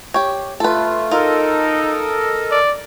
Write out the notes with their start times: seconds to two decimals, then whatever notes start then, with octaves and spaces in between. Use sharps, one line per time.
0.14 G4 C#5
0.60 A3 F4 A4 B4
1.11 D#4 F4 A4 A#4 D#5
2.52 D5